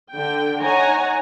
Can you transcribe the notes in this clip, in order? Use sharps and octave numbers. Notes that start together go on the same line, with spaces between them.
D3 G5
D#4 C#5 F#5 G#5 A#5